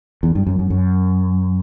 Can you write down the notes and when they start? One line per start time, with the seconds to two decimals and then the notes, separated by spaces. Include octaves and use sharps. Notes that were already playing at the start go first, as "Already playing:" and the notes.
0.23 E2
0.35 G2
0.47 F#2
0.59 F#2
0.70 F#2